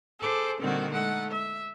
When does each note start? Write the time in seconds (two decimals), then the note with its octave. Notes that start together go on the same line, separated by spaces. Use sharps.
0.19 G#4 A4 C5 D6
0.60 A#2 D3 D#3 G3 C4 F#4
0.90 G#3 A3 D#4 F#5
1.31 E5